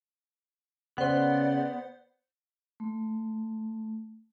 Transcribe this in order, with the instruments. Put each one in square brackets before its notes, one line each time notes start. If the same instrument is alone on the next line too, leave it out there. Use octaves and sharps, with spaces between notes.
[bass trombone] C#3 [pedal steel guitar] B3 [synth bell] C5 F#5 [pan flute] D5
[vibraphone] A3